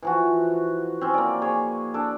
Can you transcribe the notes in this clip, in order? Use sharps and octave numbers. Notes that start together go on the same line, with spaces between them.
E3 F3 F#4
C4 C#4
A#3 D5
G#4 C#5
D4 A4 D5